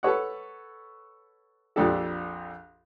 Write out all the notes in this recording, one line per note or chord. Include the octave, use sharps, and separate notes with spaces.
A4 B4 C#5 F#5
A#1 F2 F3 D4 G4 A4